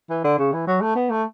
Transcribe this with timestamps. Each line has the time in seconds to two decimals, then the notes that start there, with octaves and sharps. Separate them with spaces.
0.10 E3
0.24 D3
0.38 C#3
0.53 E3
0.67 F#3
0.81 A3
0.96 B3
1.10 A3